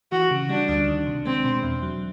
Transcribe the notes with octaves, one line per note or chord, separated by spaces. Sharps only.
E3 F#4
C#3
G3 D4
D2
D#3
C3
G#3 C4
B2
E2
F#3